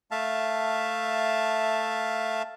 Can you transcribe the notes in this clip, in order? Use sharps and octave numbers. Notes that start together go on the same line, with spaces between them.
A3 E5 F5 A5